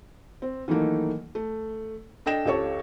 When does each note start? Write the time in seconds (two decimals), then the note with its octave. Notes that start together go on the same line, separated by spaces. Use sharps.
0.42 C4
0.68 D#3 E3 F#3 A3 A#3 D#4
1.35 A3
2.26 D4 A4 D#5 G5 A#6 E7
2.45 C#2 G4 A4 C#5 C#6